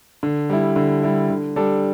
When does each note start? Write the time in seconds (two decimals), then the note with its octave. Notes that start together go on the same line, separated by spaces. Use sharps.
0.23 D3
0.50 G3 E4
0.76 D3
1.03 G3 E4
1.30 D3
1.56 G3 D4 A4